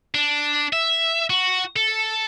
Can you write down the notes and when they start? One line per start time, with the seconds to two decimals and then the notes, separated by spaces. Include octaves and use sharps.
0.14 D4
0.73 E5
1.30 F#4
1.76 A4